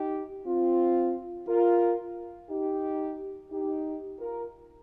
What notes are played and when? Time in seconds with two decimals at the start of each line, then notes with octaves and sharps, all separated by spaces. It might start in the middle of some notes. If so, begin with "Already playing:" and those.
Already playing: D#4 G4
0.46 C4 F4
1.48 F4 A#4
2.50 D#4 G4
3.52 D#4 G4
4.19 F4 A#4